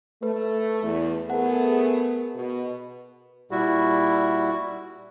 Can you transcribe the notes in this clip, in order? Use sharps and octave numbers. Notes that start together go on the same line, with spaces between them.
A3 B4
E2
A3 B3 G#4 A#4 F#5
B2
A#2 G3 E4 F#4